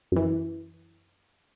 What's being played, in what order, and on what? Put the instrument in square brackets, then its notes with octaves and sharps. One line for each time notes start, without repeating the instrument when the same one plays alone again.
[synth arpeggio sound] F#2 E3